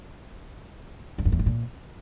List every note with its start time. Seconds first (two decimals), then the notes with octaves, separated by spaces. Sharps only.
1.18 E2
1.25 F#2
1.32 E2
1.39 A2
1.46 A#2